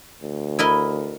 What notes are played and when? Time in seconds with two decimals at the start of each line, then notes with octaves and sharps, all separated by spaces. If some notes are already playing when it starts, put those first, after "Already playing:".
0.22 D2
0.59 E4 A#4 D#5